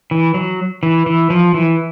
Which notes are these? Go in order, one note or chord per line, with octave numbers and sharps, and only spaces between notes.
E3
F#3
E3
E3
F3
E3